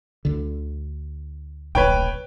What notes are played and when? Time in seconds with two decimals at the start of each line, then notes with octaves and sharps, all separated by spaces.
0.25 D2 D3
1.75 D1 A#1 B4 C#5 G5